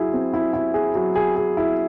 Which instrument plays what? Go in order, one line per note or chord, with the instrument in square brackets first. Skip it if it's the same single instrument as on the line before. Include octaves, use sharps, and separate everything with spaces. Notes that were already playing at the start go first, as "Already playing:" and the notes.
Already playing: [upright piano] F#3 E4 G#4
C4
E4
E4
G#4
F#3
G#4
G#4
E4